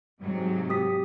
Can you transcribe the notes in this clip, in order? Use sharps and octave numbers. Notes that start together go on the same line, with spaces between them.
G#2 C3 F#3
G4 D#6 B6